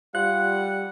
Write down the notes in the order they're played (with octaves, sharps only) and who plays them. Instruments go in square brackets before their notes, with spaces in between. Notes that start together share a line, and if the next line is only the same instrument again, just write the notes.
[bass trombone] G3 [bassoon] F4 [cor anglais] F#5 [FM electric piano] F#6